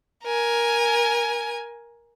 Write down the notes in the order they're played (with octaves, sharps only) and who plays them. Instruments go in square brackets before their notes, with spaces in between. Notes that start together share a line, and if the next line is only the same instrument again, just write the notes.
[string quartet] A#4 G#5